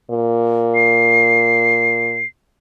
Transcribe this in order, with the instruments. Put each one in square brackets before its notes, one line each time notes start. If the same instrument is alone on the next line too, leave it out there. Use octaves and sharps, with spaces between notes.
[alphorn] A#2
[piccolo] C7